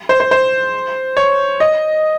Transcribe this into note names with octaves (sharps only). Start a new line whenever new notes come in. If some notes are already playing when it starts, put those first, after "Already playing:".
C5
C5
C5
C#5
D#5